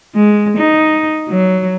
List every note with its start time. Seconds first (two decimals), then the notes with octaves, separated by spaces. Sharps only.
0.15 G#3
0.58 D#4
1.29 F#3